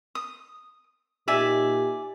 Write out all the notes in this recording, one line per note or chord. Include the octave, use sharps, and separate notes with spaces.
D#6
A#2 D#4 G4 D5 E5 G#5